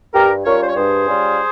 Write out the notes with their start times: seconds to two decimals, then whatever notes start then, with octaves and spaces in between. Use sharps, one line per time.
0.14 G2 G4 A#4
0.45 G3 C#4 F4 A#4 C#5
0.61 C5
0.69 C#5
0.76 G2 G#4 C5
1.07 G3 C#4 F4